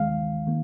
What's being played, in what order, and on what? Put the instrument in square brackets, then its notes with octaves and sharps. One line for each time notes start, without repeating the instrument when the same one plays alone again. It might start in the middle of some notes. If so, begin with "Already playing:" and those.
Already playing: [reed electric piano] D#2 D#3 G#3 F5
D#3 A#3